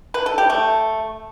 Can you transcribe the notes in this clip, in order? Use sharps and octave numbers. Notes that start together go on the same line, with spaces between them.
B4
A4
G4
A3